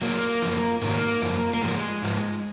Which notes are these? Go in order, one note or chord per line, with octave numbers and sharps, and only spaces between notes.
A#2 F#3 A#3
F#2 F3
G#2 D#3 F#3 A#3
F#2 F3
A#3
G#2 F3 G#3
G#2 F3